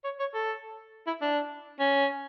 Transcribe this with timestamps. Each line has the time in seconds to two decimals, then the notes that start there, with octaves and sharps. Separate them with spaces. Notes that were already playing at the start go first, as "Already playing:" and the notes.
0.04 C#5
0.19 C#5
0.34 A4
1.07 E4
1.21 D4
1.79 C#4